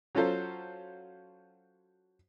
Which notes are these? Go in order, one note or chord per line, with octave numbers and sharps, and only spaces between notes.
F#3 C#4 F4 A4 C5